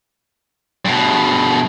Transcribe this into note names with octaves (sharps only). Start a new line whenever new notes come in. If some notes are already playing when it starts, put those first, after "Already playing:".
G2 B2